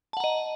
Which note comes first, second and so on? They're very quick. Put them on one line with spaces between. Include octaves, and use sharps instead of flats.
A5 F#5 A#5 D#5